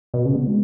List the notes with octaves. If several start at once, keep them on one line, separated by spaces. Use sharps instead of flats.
B2
C#3
B3
G#3